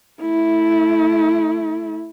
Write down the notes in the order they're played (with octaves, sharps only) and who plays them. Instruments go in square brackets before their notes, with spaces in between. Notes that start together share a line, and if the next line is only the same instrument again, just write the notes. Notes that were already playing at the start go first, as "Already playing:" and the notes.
[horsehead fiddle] A3 E4